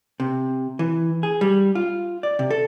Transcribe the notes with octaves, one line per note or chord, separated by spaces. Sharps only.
C3
E3
G#4
G3
F4
D5
C3
A4